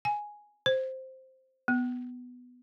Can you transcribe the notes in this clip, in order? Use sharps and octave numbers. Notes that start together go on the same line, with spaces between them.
G#5
C5
B3